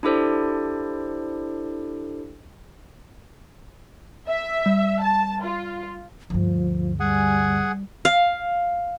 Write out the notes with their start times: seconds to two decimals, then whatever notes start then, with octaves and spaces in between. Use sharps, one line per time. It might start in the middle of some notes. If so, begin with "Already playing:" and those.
0.03 D4 E4 G4 A4 C5 D5
4.27 E5
4.66 G3
5.01 A5
5.42 F4
6.30 D2 G2 F3
7.00 G3 G#4 F#5 G#5
8.05 F5